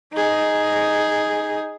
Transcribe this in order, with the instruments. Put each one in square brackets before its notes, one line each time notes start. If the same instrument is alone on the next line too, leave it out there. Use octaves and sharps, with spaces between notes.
[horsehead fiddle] D#4 G#4